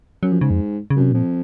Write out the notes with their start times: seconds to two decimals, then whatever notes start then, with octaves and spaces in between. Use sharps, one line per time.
0.23 F#2 F#3
0.32 F3
0.41 G#2 C#3
0.50 F2
0.90 C#3
0.96 F#2 C3
1.12 F2 A#2